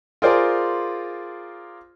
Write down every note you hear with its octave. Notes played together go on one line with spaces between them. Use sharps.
F4 G#4 A#4 C5 D5